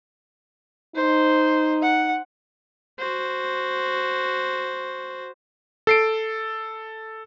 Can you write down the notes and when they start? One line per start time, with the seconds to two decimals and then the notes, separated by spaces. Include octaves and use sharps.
0.96 D#4 C5
1.82 F#5
2.99 F#4 C5
5.87 A4 C7 D7